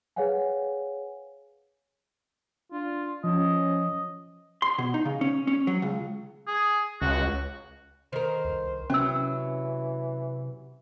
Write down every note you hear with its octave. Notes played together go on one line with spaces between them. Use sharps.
G#4 B4 C#5 F5 F#5 G#5
D4 F4
F3 C#4 D#5
C6
B2
D#4
C#3
C#4
C#4
F#3
C#2
G#4
C#2 F#4
D#3 A#4 C5
C2
C3 E3 F#3 C#4 E6